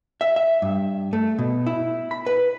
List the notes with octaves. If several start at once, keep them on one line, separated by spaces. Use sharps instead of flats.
E5
E5
G2
A3
B2
E4
B5
B4